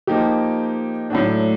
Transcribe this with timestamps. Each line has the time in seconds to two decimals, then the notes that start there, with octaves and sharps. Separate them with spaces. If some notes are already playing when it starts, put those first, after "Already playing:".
0.07 F3 A#3 D#4 G4
1.10 A2 F#3 A3 D4